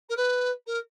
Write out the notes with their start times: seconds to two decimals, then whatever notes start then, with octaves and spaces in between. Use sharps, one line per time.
0.09 A#4
0.16 B4
0.67 A#4